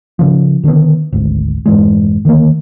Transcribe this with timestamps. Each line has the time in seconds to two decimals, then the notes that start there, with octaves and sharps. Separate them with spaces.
0.19 C#3 F3
0.63 B2 D3 D#3 B3
1.12 G#1 D2
1.66 F1 G#2 E3 G#3
2.25 D3 D#3 G#3 A#3